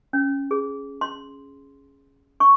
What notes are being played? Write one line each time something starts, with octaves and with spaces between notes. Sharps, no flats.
C#4
G#4
C6
C#6